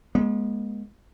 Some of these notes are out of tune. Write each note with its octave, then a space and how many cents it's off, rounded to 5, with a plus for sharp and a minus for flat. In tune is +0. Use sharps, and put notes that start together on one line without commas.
G#3 +0 B3 -45